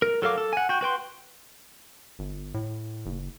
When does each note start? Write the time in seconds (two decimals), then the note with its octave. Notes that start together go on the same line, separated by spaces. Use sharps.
0.02 A#4
0.22 F#3 A4 A#4 F5 D6
0.38 A4
0.53 F#5 G#5
0.69 F#4 G5
0.81 F#4 B4 G5 C6
2.19 G1
2.54 A2
3.06 F#1